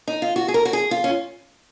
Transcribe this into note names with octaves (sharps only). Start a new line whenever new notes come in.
D#4
F4
F#4
G#4
A#4
F#4
G#4
F4
C#4